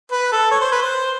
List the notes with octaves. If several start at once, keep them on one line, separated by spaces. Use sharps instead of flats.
B4
A4
C#5
C5
B4
C5